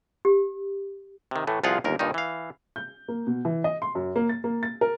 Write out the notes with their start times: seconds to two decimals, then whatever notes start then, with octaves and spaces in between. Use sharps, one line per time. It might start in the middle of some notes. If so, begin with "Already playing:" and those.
0.25 G4
1.31 C3 D#3
1.47 A2 E3 A3
1.63 C2 F3 F4 G#4 F5 F#5
1.84 G1 D#2 A#4
1.99 G2 A#2 D#3 D#4
2.14 E3 F5
2.76 G6
3.08 A#3
3.27 B2
3.45 E3
3.64 D#5
3.82 C6
3.95 F#2
4.16 A#3
4.29 A6
4.44 A#3
4.63 A6
4.81 A#4